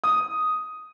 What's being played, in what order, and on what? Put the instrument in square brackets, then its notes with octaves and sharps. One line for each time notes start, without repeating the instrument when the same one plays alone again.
[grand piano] D#6